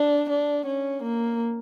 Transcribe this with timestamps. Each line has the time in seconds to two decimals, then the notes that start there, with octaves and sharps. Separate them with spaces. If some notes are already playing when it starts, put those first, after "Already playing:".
Already playing: D4
0.30 D4
0.66 C#4
1.03 A#3